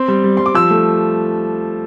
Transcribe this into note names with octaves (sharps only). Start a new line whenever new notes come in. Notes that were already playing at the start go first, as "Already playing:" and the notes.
Already playing: C4 C6
G3
G3
G3 C6
D6
F3 E6
A3